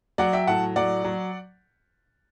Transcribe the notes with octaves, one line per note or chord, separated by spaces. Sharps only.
F#3 D5 F#5
E5 G5
A2 F#5 A5
F#3 D5 F#5
F#3